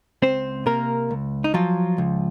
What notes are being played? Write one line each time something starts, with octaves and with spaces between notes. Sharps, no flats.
C#2 C4 C5
C3 A#3 A#4
C#2
D#4
F3 F#3 F4
C#2